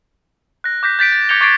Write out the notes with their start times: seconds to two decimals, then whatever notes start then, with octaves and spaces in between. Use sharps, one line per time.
0.64 F#6 A#6
0.83 D6 G6 A#6 B6
0.99 G6 A6 B6 D7
1.12 A6
1.29 D6 G6 G#6 C#7 F7 G7
1.41 C#6 D6 G#6 A6 C7 D7